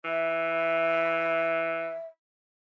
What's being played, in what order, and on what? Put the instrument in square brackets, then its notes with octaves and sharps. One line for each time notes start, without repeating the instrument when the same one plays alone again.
[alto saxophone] E3 [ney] E5